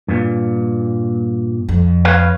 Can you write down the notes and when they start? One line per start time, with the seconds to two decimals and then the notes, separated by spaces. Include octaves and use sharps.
0.08 G2 A#2
1.69 F2
2.05 B4 C#5 F5